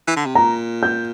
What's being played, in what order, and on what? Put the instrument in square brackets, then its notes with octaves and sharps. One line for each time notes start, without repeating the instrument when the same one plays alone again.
[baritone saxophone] E3
D3
C3
[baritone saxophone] A#2 [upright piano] A#5
[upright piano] G6